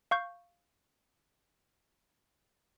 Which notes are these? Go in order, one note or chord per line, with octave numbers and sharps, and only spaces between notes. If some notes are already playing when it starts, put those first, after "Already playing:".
F5 C#6 G6